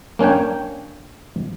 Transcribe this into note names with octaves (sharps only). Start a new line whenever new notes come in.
A#3 C#4 D4 C#5 G5